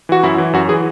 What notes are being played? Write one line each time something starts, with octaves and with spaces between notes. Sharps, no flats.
E3 F#4
F#2 E4
E3
F#2 F#4
E3 G#4